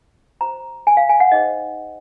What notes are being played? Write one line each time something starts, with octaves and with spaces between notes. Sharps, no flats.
F#4 C5 A#5
G#5
F5
G#5
F#5
D#4 G#4 C5 D#5